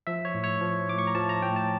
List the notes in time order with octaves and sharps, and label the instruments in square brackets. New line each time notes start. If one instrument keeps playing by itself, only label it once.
[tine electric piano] F3 E5
C#5
A2
C#5
F3
A2 D6
C#6
A#5
F3 A5
A#5
A2 G5
A5